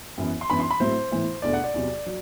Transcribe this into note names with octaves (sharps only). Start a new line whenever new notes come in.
F#2 E3 B3
C6
F#2 E3 B3 D4 B5
C6
B5
A2 F#3 C4 E4 C5
A2 E3 B3 E4
E2 B2 A3 D4 D5
F#5
D5
E2 C3 F#3
F#3